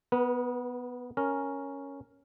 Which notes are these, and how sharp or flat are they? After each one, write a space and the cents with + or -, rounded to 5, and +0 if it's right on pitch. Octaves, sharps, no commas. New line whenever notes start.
B3 +0 B4 -35
C#4 +0 A#4 +0